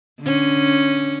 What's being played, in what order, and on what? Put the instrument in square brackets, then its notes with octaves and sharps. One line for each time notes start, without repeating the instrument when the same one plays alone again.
[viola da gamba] D3 C#4